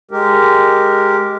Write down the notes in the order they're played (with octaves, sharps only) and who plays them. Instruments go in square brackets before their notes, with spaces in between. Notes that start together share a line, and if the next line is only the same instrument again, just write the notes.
[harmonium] G#3 G4 A#4